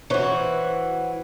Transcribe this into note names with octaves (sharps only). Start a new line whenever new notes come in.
E3 F#4 C5 C#5